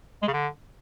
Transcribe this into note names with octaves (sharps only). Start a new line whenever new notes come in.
G#3
C#3
D3